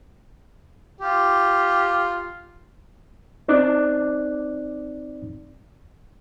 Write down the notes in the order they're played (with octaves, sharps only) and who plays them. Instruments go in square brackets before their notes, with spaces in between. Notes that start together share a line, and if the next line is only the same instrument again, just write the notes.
[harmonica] F4 G4
[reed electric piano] C4 D#4 D5 D6 F#6